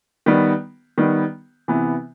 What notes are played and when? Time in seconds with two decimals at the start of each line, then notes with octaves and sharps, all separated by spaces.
0.26 D#3 G3 B3
0.98 D#3 G3 B3
1.68 C3 E3 B3